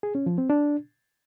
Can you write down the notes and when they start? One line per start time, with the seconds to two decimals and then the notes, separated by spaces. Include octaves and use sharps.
0.03 G#4
0.15 C#4
0.26 F3
0.38 C4
0.50 D4